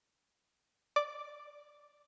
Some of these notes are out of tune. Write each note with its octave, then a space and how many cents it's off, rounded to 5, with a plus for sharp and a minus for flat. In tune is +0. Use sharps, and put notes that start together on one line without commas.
D5 +0 D6 +0